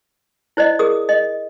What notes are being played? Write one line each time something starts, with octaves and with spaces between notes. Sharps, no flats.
E4 C5 D5 D#5
G#4 A#4 D#6
D#5